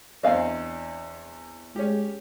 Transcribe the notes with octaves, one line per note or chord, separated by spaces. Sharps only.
E2 C4 D4 D#5 F5 G#5
G#3 C#4 G4